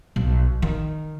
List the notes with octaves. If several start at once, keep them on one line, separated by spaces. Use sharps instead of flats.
B1
D#3